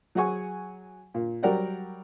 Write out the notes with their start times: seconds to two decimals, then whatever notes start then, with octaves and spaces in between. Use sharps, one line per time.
0.15 F#3 G#4 F#5 G#5 C#6
1.14 A#2
1.43 F#3 G3 A#4 D5 F#5 G5